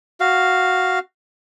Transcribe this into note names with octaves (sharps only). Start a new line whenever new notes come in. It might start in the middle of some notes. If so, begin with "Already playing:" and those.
F#4 F5